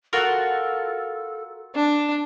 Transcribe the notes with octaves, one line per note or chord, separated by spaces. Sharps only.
F4 F#4 A4 A#4
D4